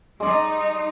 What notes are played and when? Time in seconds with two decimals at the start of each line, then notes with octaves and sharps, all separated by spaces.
0.20 G3 G#3 D#4 D5